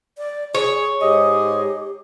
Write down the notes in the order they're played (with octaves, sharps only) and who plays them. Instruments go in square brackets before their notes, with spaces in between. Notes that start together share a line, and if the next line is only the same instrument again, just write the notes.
[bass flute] D5
[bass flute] G#4 [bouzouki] C#5
[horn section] G#2 G#4 D#5 [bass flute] G4